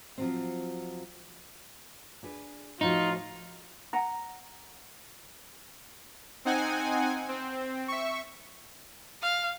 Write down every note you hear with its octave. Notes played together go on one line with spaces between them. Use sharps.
F3 F#3 C4
D4 G#4 B4
A2 F3 D#4 F4 F#4
F#5 A#5
C4 D#4 F#5 G#5
C4
E5 C#6
F5